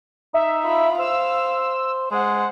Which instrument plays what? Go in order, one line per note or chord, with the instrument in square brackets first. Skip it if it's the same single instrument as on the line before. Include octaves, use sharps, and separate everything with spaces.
[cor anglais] D#4 [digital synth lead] E5
[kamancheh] F4 B5
[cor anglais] C5 [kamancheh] F5 [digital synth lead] E6
[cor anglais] G#3 [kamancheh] C5 F#5